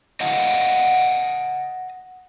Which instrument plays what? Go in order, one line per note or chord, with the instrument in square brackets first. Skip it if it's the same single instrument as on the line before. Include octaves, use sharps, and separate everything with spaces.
[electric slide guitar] D#5 F5 F#5 A5